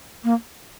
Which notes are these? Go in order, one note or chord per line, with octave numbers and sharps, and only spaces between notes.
A#3